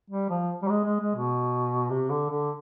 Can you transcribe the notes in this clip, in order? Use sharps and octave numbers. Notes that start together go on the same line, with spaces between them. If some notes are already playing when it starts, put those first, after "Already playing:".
G3
F3
G3
G#3
G#3
G#3
B2
C3
D3
D3